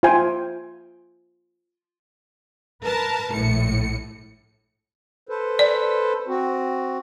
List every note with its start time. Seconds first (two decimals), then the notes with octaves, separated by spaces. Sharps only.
0.03 F4 C5 E5 G5 G#5 C6
2.84 A#4 B4 A5
3.32 A#1 A2 C#7
5.29 A4 B4 C5
5.59 D5
6.27 C4 F#4